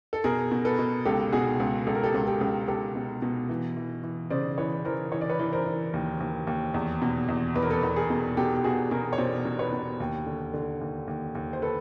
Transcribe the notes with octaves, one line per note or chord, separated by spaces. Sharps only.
A4
B2 G#4 A#4
B2
A4 B4
B2
C#2 G4 A4
B2 F#4 G#4
C#2
C#2 A4
A#4
G4 A4
C#2
G4 A4
C#2
C#2 G4 A4
B2
B2
E3
E3
E3
C#3 C5 D5
E3 B4 C#5
E3 A#4 C5
E3 C#5
D5
B4 C#5
E3
A#4 C5
E3
D#2
D#2
D#2
E2
B2
E2
E2 B4
A#4
A4 B4
E2
G#4 A#4
B2
B2 G4 A4
G4
B2 F#4 G#4
B2 G#4 A#4
C#5
B2 C5 D5
B2
B4 C#5
B2
D#2
D3
D3
D#2
D#2
D#2
C5
A4 B4